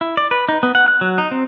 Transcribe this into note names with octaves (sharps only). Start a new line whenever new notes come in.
E4
D5
B4
D#4
B3
F#5
F#6
F#3
D#4
C4